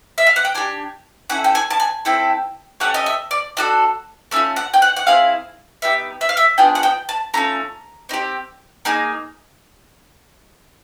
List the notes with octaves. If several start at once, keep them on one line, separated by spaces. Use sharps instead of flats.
E5
F5
F#5
G5
D4 G4 G#5
C#4 E4 A4 F#5
G5
G#5
A5
G#5
C4 E4 A4 G5
A3 C#4 G4 F#5
D#5
E5
D5
D4 F#4 A4 D#5
A3 C#4 F4 E5
F#5
G5
F#5
F#5
C4 E4 G#4 F5
B3 D#4 G4 E5
E5
F5
E5
B3 D4 F4 G#4 G5
F#5
G5
A5
A3 C#4 F4 A#5
C4 D#4 G4
A#3 D#4 G#4